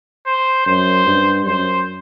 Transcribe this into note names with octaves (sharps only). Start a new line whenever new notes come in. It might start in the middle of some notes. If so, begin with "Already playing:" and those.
C5
F#2 C5
G2
F#2 C5